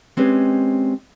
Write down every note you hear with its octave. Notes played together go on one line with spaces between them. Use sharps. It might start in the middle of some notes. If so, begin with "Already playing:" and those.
G#3 C4 C#4 G4 B4